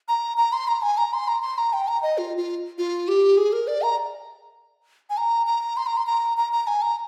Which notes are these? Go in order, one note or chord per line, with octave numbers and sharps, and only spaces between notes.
A#5
A#5
C6
A#5
G#5
A#5
C6
A#5
C6
A#5
G5
A#5
D#5
F4
F4
F4
G4
G#4
A#4
D5
A#5
G#5
A#5
A#5
C6
A#5
C6
A#5
A#5
A#5
G#5
A#5